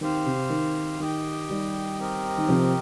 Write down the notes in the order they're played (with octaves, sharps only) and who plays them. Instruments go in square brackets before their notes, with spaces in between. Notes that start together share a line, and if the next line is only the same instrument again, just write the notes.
[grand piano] D#3 [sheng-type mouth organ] C4 G4 C5 F5
[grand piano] C3
D#3
[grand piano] D#3 [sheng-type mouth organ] G4 D#5 G5
[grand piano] D#3 G3
[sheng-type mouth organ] C4 G4 A#4 D#5
[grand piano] D#3
C3 F3